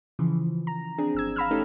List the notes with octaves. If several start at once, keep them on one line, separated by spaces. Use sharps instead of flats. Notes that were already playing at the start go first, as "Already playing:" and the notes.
C#3 E3 F3
A#5
C4 D4 G#4
G1 E6 G#6
F5 A#5 B5 E6 F6
A3 C#4 D#4 G4 A4